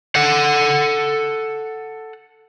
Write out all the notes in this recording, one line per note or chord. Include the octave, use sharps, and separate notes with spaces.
A4 F#5